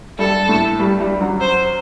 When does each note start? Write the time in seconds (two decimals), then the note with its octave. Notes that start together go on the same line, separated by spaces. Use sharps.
0.19 G2 G3 A4
0.49 A2 A3
0.80 G2 G3
1.00 G2 G3
1.20 F#2 F#3
1.41 C5